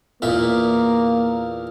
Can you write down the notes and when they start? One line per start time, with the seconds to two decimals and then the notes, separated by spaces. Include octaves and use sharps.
0.22 E2 A#2 A#3 E5